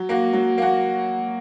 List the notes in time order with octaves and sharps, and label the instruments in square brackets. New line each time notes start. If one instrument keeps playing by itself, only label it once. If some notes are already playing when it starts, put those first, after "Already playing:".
Already playing: [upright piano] F#3
A#3 F#4
F#3
A#3 F#4